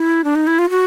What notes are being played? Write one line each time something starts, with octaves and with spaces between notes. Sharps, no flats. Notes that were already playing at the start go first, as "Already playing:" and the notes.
Already playing: E4
D4
D#4
E4
F4
F#4